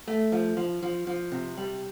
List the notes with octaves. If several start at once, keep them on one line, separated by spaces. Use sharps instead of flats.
A3
F3
F3
F3
F3
C3
G3